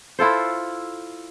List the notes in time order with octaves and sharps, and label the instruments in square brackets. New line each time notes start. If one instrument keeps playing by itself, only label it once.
[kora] E4 F4 A4 C5